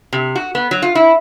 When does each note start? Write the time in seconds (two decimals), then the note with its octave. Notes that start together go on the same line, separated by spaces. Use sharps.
0.13 C3
0.36 F#4
0.55 B3
0.71 F#3
0.82 F4
0.95 E4